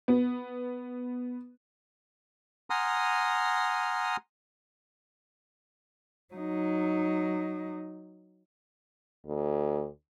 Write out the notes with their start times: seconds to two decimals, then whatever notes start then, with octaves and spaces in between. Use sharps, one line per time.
0.08 B3
2.70 F#5 G#5 A#5 C6 D#6 F6
6.34 F#3 D#4
9.26 D2